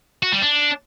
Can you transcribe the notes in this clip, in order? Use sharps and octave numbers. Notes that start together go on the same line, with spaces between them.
F#4
G3
D4